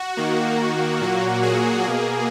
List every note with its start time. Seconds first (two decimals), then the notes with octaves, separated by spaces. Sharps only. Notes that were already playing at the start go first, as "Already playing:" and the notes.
Already playing: F#4
0.17 D#3 A#3
1.01 A#2 F#3 A#3
1.43 G#4
1.84 B2 A#3